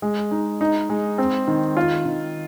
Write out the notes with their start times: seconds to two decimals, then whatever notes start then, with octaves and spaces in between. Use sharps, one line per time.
0.02 G#3
0.31 D#4
0.61 D#4
0.89 G#3
1.18 C4
1.48 D#3
1.77 F4
2.05 D#3